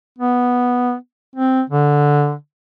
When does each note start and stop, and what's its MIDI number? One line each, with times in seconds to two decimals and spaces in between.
0.18 0.94 59
1.35 1.62 60
1.70 2.34 50